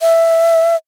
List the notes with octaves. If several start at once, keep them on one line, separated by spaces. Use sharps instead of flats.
E5